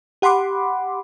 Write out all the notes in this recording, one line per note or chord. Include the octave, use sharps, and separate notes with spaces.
G4 F#5 B5 C6 D6